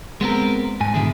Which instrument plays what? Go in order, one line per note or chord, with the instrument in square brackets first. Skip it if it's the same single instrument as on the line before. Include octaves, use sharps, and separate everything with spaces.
[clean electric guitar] G#3 B3 C4 A#4
G#2 G#5
G#2 B2 D3 D#3 E4 G#4